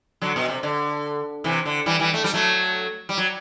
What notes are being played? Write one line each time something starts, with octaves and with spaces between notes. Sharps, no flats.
D3 F#3
B2
C3
D3
C3 E3
D3
E3 G3
E3 G3
A3
G3
F#3 A3
G3
F#3